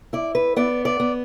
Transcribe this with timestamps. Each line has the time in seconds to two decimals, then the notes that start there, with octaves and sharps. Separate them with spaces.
0.13 E4 D5
0.35 B4
0.56 B3 D5
0.85 D5
1.00 B3